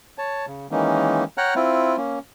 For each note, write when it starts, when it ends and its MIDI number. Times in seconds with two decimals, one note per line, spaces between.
0.18 0.46 73
0.18 0.46 81
0.47 0.67 49
0.71 1.24 51
0.71 1.24 52
0.71 1.24 56
0.71 1.24 58
0.71 1.24 61
0.71 1.24 63
1.38 1.54 73
1.38 1.54 78
1.38 1.54 79
1.38 1.54 82
1.38 1.54 89
1.38 1.54 90
1.56 1.96 60
1.56 1.96 64
1.56 1.96 65
1.97 2.19 58
1.97 2.19 61